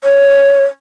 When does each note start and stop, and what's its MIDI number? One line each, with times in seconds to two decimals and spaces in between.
0.04 0.64 73